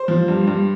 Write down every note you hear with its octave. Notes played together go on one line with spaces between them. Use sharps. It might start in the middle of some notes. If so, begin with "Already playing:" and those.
Already playing: C5
F3
G2
G2